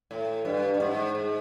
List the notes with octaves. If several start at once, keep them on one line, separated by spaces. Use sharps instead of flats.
A2
G2
G2
G#2
G#2